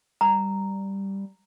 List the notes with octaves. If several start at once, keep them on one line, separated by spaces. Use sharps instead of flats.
G3 A#5